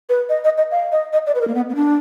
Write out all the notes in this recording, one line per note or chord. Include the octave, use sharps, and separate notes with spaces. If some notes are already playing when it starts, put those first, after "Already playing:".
B4
D#5
D#5
D#5
F5
D#5
D#5
D5
B4
A#4
A#3
B3
B3
D4